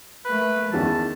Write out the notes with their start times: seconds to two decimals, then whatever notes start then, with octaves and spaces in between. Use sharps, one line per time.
0.25 A3 A#3 B4
0.73 E2 D#3 C#4 A5